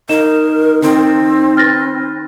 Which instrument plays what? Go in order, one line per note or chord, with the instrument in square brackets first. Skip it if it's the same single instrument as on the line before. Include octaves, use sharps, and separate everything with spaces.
[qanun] D#4 [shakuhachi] A#4 [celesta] D#5 E7
[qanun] D#3 [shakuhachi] C4
[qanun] B4 C6 [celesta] F6 A6 A#6